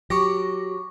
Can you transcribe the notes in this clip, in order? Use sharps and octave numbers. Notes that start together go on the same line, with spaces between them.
F#3 G4 C#6 D6 A#6